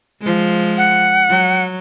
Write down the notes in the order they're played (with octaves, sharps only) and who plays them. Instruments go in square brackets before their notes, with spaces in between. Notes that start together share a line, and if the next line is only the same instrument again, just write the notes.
[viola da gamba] F3 G#3
[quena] F#5
[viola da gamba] F#3